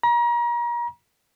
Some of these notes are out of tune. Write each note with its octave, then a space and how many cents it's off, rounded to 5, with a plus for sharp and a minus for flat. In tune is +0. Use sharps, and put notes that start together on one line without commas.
A#5 +35